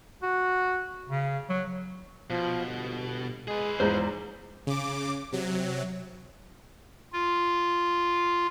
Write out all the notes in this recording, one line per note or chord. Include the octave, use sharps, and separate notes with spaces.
F#4
C#3
F#3
B2 F3
G1
G#3 G#4 B4
E2 G#2 F3 C5
C#3 D6
C3 F#3
F4